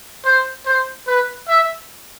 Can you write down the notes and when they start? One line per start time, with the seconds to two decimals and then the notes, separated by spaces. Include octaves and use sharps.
0.25 C5
0.66 C5
1.07 B4
1.48 E5